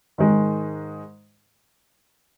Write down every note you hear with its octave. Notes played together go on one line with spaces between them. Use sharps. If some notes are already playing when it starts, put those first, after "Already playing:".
G#2 D#3 G#3 D#4